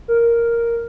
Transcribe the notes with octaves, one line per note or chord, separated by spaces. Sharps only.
A#4